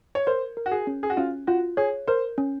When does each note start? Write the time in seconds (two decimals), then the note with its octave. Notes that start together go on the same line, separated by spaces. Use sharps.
0.15 C#5
0.27 A#4 C5
0.57 A#4
0.66 F#4
0.71 G#4
0.87 C#4
1.03 G#4
1.10 F#4
1.17 C#4 F4
1.47 F4 F#4
1.77 G#4 C#5
2.08 A#4 C5
2.38 C#4